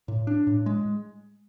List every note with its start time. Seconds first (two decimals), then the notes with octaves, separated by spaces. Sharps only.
0.08 A2
0.27 D4
0.47 A2
0.66 G#3